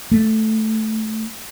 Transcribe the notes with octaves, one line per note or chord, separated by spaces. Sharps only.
A3